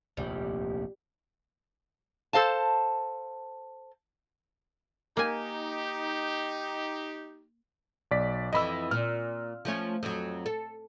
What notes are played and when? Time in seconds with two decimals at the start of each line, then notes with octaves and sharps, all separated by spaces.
0.17 F1 A#1 D#2 G3
2.33 A4 C5 F5 A5
5.17 A#3 D#4 G4 G#5
8.11 B1 D5 B6
8.53 F2 E3 D#5 B5 E6
8.91 A#2 F6
9.65 F3 A3 C#4
10.03 F2 F#3
10.46 A4